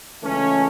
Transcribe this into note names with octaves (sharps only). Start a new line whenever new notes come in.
C#2 C#3 E3 A3 C#4